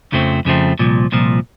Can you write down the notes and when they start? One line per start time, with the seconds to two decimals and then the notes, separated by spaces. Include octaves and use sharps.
0.12 F2 C#3 F3 A3 C4
0.45 F2 C#3 F3 A3 C4
0.79 C2 A#2 F3
1.12 C2 A#2 F3